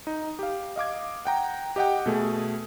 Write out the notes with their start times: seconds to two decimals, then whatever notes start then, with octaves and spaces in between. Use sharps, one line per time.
0.07 D#4
0.39 G4 F5
0.76 D#5 F5 D6 G#6
1.25 F#5 G5 A#5
1.76 G4 D#5 F#5 G5
2.06 B2 A3 G#4